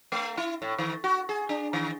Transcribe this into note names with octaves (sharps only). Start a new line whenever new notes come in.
A3
E4
A2
D#3
F#4
G#4
D4
D#3